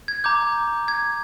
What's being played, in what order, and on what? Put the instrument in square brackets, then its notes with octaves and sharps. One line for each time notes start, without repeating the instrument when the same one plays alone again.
[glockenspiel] G#6
A#5 D6 G6
G#6